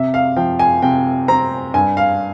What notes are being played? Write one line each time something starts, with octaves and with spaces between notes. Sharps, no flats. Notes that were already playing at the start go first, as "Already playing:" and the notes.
Already playing: C3 E5
F5
F3 G5
G#5
C3 G5
C4 A#5
G2 G#5
F5